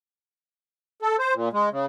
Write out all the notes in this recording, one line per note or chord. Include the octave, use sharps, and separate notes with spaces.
A4
C5
A#2
G#3
C#3